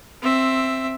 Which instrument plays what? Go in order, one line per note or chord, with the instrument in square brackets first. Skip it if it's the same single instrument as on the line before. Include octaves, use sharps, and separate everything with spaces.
[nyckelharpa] C4 E5